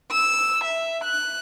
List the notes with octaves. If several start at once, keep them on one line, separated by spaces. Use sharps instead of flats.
E6
E5
F#6